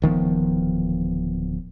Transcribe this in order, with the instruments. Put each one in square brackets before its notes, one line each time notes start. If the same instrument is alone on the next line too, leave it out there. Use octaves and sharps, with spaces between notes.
[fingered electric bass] D1 D#3 F3 B3